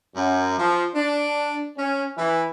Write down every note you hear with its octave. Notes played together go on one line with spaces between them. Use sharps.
F#2
F3
D4
C#4
E3